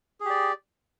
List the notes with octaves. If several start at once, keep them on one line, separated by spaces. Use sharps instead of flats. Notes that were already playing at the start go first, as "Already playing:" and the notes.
G4 G#4 D5